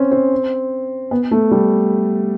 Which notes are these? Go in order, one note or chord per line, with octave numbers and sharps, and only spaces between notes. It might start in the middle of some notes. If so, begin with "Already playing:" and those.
Already playing: C4 C#4
C4
B3
A3
G3